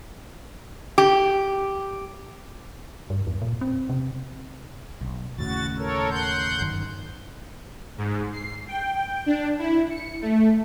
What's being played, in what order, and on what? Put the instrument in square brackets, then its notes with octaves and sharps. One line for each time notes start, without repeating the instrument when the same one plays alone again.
[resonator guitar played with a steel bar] G4
[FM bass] G2
E2
A#2
C4
C3
[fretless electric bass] B1
[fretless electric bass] D#2 A2 C#3 [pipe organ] F#4 A6
[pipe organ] A4 A#4 C#5
F#5 C6 G6
[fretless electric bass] G1 F#2 D#3
[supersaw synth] G#2
C7
G5
D4
E4
C#7
A3